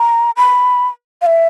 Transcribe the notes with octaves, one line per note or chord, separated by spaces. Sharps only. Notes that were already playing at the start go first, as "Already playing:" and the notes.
Already playing: A#5
B5
F5
E5